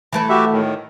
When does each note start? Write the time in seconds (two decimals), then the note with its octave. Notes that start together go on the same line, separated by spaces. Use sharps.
0.12 E3 A3 B4
0.29 F#4 G4 E5
0.52 A2 D#3